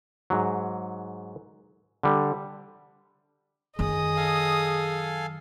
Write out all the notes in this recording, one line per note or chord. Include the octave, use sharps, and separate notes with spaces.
G#2 F#3
D3 G3
F#2 D#3 G#4 D#5 D#6
A4 F5 G#5